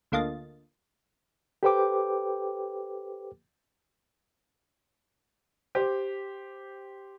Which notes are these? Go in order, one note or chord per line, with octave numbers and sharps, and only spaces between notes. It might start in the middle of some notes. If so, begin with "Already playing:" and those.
D2 D3 A#3 F4 D#5 A6
G4 A4 B4 C5 G5 D6
G4 C5